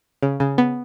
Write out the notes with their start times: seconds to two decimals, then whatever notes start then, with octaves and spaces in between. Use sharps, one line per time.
0.23 C#3
0.40 C#3
0.58 B3